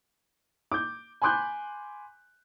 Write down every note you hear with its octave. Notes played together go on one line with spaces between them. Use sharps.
D6 G6
G#5 B5 C6 D6 F#6 G6